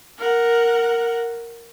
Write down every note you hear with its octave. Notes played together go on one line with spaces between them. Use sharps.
A#4 F#5